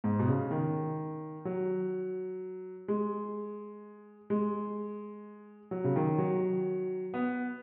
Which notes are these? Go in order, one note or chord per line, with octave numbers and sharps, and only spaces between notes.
G#2
B2
C#3
D#3
F#3
G#3
G#3
F#3
C#3
D#3
F#3
B3